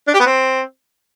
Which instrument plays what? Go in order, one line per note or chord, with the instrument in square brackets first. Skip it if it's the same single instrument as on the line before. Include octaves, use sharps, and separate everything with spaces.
[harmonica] D4
G4
B3
C4